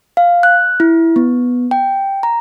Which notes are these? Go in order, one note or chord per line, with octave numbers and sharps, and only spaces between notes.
F5
F#6
E4
B3
G5
A#5